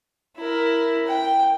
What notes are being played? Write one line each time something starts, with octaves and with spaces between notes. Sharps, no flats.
E4 A#4
G5